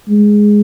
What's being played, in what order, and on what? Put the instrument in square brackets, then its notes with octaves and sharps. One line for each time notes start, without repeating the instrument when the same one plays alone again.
[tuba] G#3